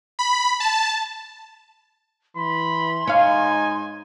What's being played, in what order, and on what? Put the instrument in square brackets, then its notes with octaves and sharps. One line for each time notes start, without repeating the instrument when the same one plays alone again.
[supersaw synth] B5
A5
[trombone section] E3 [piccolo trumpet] B5 [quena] C6
[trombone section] G#2 D#4 [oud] C#5 F5 [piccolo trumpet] G#5